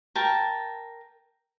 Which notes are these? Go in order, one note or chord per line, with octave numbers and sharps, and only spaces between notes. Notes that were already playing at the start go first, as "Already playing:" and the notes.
A#4 G5 A5